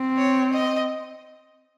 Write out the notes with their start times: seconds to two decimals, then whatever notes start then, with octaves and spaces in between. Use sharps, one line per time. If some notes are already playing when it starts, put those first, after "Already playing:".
Already playing: C4
0.18 C#5
0.53 D#5